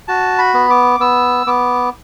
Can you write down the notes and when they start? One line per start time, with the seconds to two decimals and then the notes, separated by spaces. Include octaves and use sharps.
0.08 F#4 A5
0.38 B5
0.54 B3
0.70 D6
1.00 B3 E6
1.47 B3 D6